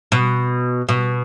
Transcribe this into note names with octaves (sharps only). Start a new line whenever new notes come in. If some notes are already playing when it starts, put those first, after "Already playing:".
B2
B2